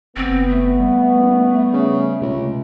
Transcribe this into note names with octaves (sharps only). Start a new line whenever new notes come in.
F#1 B3 C4
A3
G3
D#1
C#3
C#2 C3